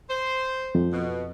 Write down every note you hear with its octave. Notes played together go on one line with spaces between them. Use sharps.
C5
F2
B2